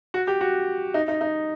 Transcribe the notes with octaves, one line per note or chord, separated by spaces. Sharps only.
F#4
G4
F#4
D#4
D#4
D#4